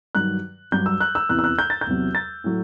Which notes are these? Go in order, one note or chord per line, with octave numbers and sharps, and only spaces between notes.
G2 D#3 F#3 F#6
G2 F#3 G6
E6
F#6
E6
E2 C3 E3 F#6
E6
F#6
G6
A6
G6
E2 C3 F#3
A6
A2 F#3